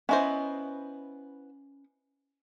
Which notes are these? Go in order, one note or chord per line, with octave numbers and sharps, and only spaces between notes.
B3 C#4 E4 C5 D#5 G#5